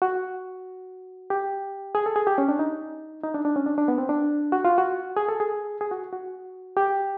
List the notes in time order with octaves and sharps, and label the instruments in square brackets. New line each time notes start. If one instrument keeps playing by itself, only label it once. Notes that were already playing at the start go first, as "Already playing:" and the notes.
[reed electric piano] F#4
G4
G#4
A4
G#4
G4
C#4
D4
D#4
D#4
D4
D4
C#4
D4
D4
B3
C4
D4
F#4
F4
F#4
G#4
A4
G#4
G#4
F#4
F#4
G4